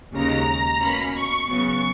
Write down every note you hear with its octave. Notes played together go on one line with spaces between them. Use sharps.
D#2 C#3 G#3 C#4 A#5
B2 A#3 C#4 B5
C#6
C#3 F#3 B3 C#6